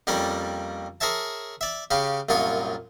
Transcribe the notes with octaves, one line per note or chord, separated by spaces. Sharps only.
F2 G3 A#3 C#4 D5
G#4 A#4 C#5 E5 A5
D5 E5
C#3 C#4 G4 F5
C2 F#2 A#2 F4 C#5 D#6